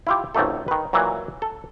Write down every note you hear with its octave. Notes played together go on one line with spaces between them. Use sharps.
E4 F4 G4
G#1 C#2 G#2 A3 A4
D#3 B4
A#2 E3 F#3
A4